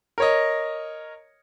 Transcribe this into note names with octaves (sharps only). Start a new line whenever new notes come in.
A#4 C#5 D#5